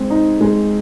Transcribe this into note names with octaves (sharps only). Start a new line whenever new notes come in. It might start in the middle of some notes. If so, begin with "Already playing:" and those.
Already playing: G#3 C4
D#4
G#3